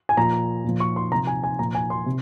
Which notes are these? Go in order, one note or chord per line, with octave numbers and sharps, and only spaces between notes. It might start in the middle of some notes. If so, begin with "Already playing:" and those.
G#5
A#2 F3 A#5
A#2 F3
C#6
C6
C3 F3 A#5
G#5
G#5
A#2 F3 A#5
G#5
C6
C3